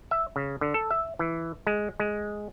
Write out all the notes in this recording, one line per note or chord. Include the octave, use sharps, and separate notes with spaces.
E5
C#3
D3
A4
E5
E3
G#3
G#3